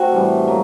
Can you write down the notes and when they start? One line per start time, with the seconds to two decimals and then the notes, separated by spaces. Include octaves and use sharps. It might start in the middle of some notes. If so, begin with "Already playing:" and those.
Already playing: A3 C4 F#4
0.12 A2 E3 G3
0.47 F#3 A#3